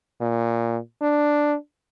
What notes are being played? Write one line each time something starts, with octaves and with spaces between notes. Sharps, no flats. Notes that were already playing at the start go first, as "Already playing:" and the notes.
A#2
D4